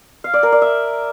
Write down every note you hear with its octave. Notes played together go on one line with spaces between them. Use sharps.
F5
D5
A#4
D5
E5